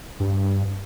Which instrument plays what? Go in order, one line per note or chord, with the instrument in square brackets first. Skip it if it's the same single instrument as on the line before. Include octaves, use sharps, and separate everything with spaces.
[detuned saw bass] G2